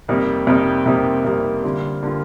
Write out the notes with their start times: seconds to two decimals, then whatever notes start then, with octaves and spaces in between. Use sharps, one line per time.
0.08 F2 C3 G3 A#3 D#4
0.47 F2 C3 G3 A#3 D#4
0.86 F2 C3 G3 A#3 D#4
1.25 F2 C3 G3 A#3 D#4
1.63 D3 G3 A#3 F4
2.03 D3 G3 A#3 F4